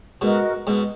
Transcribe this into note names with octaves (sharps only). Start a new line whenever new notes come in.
G#2 B2 F#4 A#4 D#5
G#2 B2